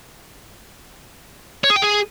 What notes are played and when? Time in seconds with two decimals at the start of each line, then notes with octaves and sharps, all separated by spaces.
1.64 C#5
1.70 G#4
1.76 G5
1.82 G#4